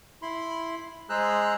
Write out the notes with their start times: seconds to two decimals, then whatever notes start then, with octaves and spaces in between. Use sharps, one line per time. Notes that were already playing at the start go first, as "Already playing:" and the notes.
0.22 E4 B5 C6
1.10 G#3 G#4 C5 A#5 E6 F#6